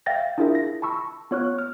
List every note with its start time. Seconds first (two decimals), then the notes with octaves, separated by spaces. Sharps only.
0.06 E5 F5 G5 A6 A#6
0.38 D4 E4 F4 G#4 A#4 E5
0.55 A#6
0.82 A5 B5 C#6 E6
1.31 B3 F4 C#5 C#6 F6 F#6
1.59 F6